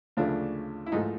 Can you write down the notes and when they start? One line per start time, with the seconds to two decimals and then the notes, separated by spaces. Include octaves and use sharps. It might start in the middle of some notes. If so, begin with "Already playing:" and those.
0.17 D2 C#3 F3 A3 D4
0.86 E4
0.92 G#2 F3 A3 D#4